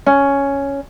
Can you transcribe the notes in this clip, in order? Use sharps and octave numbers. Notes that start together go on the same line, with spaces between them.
C#4